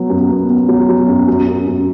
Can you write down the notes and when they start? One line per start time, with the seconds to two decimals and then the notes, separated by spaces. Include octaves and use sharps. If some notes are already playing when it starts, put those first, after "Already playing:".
Already playing: F#3 B3
0.10 F#2
0.29 B3
0.49 B3
0.68 F#3
0.89 F#3
1.08 F#2
1.28 F#2
1.47 F#2
1.67 F#2